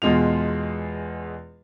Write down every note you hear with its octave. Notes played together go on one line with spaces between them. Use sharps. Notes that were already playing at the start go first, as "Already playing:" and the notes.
E2 B2 G#3 F4 F7